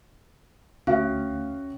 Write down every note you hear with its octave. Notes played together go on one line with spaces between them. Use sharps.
D2 C#4 F#4 E5 F5